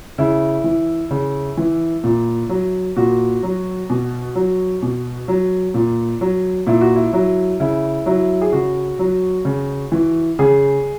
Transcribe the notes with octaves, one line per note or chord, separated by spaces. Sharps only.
C#3 E4
E3
C#3
E3
A#2
F#3
A#2 F#4
F#3
B2
F#3
B2
F#3
A#2
F#3
A#2 E4
F#4
E4
F#3
C#3 E4
F#3 E4
G#4
C#3 F#4
F#3
C#3
E3
C#3 G#4